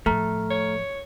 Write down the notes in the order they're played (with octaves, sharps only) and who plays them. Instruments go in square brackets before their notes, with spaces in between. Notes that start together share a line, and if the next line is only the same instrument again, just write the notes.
[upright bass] A2 F3 [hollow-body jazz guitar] A3 [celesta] A#5 F6
[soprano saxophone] C#5